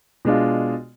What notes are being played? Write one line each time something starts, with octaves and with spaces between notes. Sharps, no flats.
B2 G#3 D4 F4